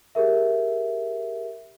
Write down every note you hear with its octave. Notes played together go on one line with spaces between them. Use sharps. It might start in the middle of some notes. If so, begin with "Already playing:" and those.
G4 G#4 A#4 E5